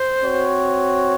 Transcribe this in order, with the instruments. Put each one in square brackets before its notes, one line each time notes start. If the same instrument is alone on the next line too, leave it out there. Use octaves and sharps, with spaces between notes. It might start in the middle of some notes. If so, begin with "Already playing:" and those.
Already playing: [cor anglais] C5
[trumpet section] C4 F#4 C#5